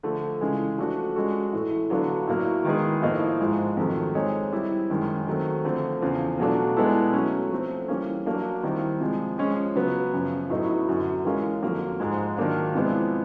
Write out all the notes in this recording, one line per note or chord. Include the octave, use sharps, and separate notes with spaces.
D3 F3 A3
C#3 E3 G#3
F3 A3 D4 F#4
G#3 C#4 F#4 A4
A2 E3 A3
D3 F#3 B3 D4 F4
A2 F#3 A#3
D#3 G#3 B3 E4 G#4
A2 F3 A#3 D#4
G#2 F3 G#3
F2 C3 D#3 F#3 A3
G#3 C4 D#4 G#4 C#5
G3 C4 E4
F#2 D#3 G#3 C#4
D#3 F#3 A3 C4
D3 F3 A3 C4
E2 C#3 F3
B2 F#3 A3 D4 F4
B2 G#3 B3 E4 A4
F#3 A3 C#4
F3 A3 C4
E3 G3 A#3 C#4
F#3 A#3 D4
D#3 G3 C4 E4
C3 F3 G#3
F3 G#3 C#4
C#3 F#3 B3
F#2 C#3 F3
A2 F#3 B3 D#4
F#2 D3 F#3
E3 G#3 C#4 F4 A#4
F2 D3 F#3 A#3
G#2 F3 G#3
D#3 F#3 A#3 D4 F4
C3 F3 G#3 B3 E4